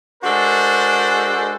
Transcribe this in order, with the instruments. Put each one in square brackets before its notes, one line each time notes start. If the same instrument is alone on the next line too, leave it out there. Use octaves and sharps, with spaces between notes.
[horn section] G#3 D4 F#4 A4 A#4 C5